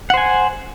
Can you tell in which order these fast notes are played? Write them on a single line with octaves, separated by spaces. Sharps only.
F#5 C5 G#5